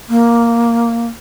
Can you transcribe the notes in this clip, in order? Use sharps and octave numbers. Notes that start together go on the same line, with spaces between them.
A#3